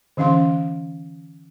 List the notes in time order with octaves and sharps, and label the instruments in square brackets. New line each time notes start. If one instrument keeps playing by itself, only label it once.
[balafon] D3 E3 C#4 F5 C6